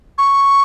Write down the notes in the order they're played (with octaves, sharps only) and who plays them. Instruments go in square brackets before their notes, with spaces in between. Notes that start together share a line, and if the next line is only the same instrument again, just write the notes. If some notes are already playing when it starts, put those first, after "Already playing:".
[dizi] C#6